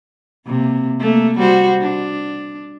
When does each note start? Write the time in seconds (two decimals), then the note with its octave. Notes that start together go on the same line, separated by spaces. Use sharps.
0.47 C3 A#3
1.00 A3 A#3
1.39 G3 F#4 C5
1.81 D4